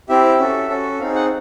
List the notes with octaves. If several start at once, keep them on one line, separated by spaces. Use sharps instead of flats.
C4 E4 G4 E5
C#4 F#4 A4
C#4 F#4 A4
C4 D#4 G#4 F5
F#5